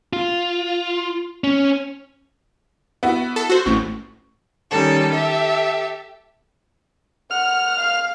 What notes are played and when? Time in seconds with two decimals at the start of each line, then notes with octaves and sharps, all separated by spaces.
0.13 F4
1.44 C#4
3.03 B3 E4 F#4
3.36 A4
3.50 F#4 C5
3.66 A1 A2 C#6
4.71 D#3 G3 C#4 A4
5.10 G4 A4 E5
7.31 F#5 F6
7.80 F5